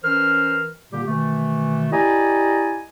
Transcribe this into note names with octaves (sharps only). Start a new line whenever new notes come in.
E3 C#4 A#4 C5 F6
A#2 D3 G3 A#3 G4
B2 D#3 E3 A3
E4 G4 D5 D#5 G#5 A#5